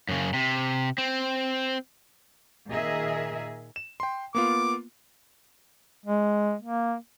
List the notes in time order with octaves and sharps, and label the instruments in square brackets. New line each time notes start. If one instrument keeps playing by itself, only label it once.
[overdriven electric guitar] F#2 C#3
C3
C4
[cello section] A#2 D#3 G#4 A#4 D#5 E5
[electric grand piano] E7
G5 C6
[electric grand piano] A#3 B3 F4 [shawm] D6
[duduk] G#3
A#3